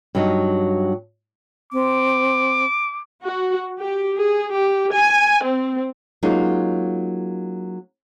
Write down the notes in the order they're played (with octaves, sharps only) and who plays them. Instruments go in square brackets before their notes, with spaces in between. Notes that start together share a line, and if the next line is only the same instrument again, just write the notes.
[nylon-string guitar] G2 F#3 D#4
[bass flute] C4 [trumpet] D6
[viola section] F#4
G4
G#4
G4
G#5
C4
[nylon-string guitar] F#3 G#3 A#3 C#4 D#4 F4